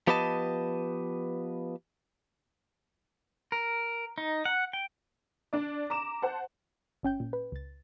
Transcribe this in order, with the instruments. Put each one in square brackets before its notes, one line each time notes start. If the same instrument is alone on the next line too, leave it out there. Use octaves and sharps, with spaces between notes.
[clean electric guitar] F3 B3 G4 B4 D#5 A5
[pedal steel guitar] A#4
D#4
F#5
G5
[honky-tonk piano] D4 D5
A#5 D6 E7
C5 F#5 A5
[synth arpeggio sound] G1 C#4 G5 G6
A#2
B4
C#2 A6